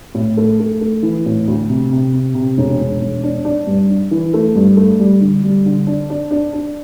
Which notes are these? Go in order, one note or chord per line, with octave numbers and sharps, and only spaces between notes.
A2
A3
A3
A3
E3
A2
D2
C3
C3
C3
C3
E1
E1
E1
D4
D4
G2
D4
E3
A3
G2
A3
G3
D3
G3
D3
D4
D4
D4
D4